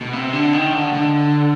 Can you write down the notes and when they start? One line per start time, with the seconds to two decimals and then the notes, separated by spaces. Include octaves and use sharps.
0.01 B2
0.13 C3
0.33 D3
0.53 D#3
0.73 D3
0.93 D3